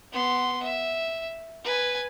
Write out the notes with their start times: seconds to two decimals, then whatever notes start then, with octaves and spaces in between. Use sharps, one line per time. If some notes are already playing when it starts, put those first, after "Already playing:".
0.12 B3 C6
0.63 E5
1.64 B4 G#5